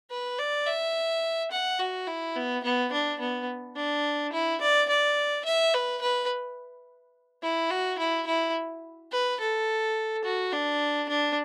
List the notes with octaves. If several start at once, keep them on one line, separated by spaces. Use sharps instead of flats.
B4
D5
E5
F#5
F#4
E4
B3
B3
D4
B3
D4
E4
D5
D5
E5
B4
B4
E4
F#4
E4
E4
B4
A4
F#4
D4
D4